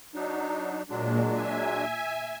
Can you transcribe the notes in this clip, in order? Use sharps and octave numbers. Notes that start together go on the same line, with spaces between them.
F#3 D4 D#4
A#2 F#3 G#3 D4
E5 G#5